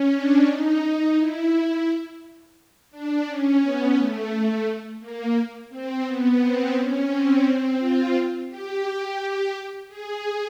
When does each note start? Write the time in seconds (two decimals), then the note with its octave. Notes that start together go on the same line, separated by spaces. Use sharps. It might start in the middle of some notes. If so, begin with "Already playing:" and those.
Already playing: C#4
0.12 D4
0.47 D#4
0.82 D#4
1.17 E4
2.91 D4
3.25 C#4
3.61 B3
3.96 A3
4.30 A3
5.00 A#3
5.70 C4
6.05 B3
6.39 C4
6.74 C#4
7.09 C4
7.44 C4
7.79 F4
8.48 G4
8.84 G4
9.88 G#4